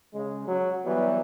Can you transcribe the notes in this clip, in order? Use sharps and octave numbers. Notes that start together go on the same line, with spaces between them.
C#3 G#3
F#3
E3 F#3 G3 B3